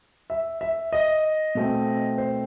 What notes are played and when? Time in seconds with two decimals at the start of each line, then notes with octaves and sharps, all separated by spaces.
0.30 E5
0.61 E5
0.93 D#5
1.55 B2 A3 C4
2.18 C5